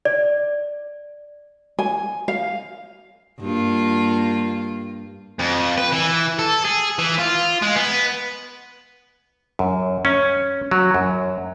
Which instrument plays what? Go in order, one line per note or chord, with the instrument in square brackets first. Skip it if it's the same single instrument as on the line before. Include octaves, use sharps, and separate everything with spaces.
[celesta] D5
[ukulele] G#5
F5
[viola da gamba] G2 A#3 F4
[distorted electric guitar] F2
B4
E3
A4
G#4
E3
F4
G#3
B3
[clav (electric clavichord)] F#2
C#4
F#3
F#2